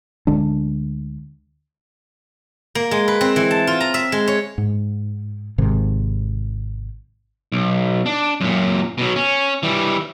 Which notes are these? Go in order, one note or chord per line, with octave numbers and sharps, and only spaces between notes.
D2 D3 G#3 D4
A#3
G#3
B4
C4
E3
A5
F4
A#5
E5
G#3
C#5
G#2
G#1 G#2 C3 D#3
B1
D4
F#2 A#2
B2 F#3
C#4
E3 G3